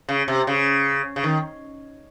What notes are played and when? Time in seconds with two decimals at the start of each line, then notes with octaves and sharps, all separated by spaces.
0.09 C#3
0.28 C3
0.47 C#3
1.16 C#3
1.24 D#3